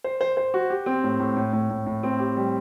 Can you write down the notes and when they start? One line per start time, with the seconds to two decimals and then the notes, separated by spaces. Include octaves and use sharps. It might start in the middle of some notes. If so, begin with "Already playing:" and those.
0.04 C5
0.21 C5
0.37 C5
0.54 F#4
0.70 G4
0.86 C4
1.04 A2
1.19 A2
1.37 A2
1.53 A2
1.70 A2
1.86 A2
2.03 C4
2.19 G4
2.37 G3